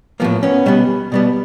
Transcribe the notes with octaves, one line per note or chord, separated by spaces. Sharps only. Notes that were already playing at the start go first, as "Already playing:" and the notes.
A2 F3 A#3 B3
B3 C#4
B2 G3 B3
B2 G3 B3